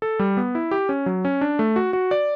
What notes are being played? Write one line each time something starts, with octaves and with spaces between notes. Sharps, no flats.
A4
G3
B3
E4
G4
C#4
F#3
C#4
D4
A3
F#4
F#4
D5